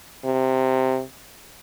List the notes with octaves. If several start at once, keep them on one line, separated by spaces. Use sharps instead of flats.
C3